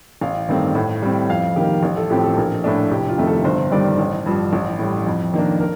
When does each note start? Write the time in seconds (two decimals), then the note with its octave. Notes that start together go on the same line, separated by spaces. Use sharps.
0.21 A1 F5
0.48 G2 D#3 A3 C4
0.75 A2
1.02 G3 C4
1.29 F2 F5
1.56 D#3 A#3 G4
1.83 A1
1.97 A4
2.10 A2 F3 C4 G4
2.23 A4
2.37 A#1 A#4
2.64 A2 A3 D4
2.91 F1 G4
3.09 F4
3.18 F2 C3 D#3 A3
3.27 A4
3.44 G1 C5
3.71 G2 D#3 G3 D5
3.98 A1
4.26 G2 F3
4.53 A1
4.79 A2 G3
5.07 F2
5.34 D#3 A#3 D4
5.61 A#4